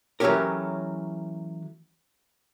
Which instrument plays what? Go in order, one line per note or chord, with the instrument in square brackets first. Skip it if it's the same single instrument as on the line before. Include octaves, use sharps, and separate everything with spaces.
[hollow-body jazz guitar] E3 F#3 A3 C#4 G4 A#4